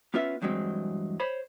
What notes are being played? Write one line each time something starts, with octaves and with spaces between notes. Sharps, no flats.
B3 C#4 F4 B4 E5
E2 G2 F#3 G#3 C4
C5 C#5 B5